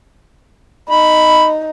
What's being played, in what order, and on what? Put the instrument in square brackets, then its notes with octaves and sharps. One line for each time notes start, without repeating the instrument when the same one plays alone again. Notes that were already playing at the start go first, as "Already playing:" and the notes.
[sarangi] D#4 [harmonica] B5